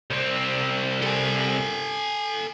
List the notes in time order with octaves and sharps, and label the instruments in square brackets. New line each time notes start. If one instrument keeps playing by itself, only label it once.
[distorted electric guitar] C2 C4
[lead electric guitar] A4 G#5